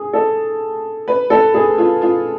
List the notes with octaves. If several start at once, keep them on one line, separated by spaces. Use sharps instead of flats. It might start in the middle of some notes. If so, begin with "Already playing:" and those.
Already playing: G#4
A4
B4
A4
G#4
F4
F4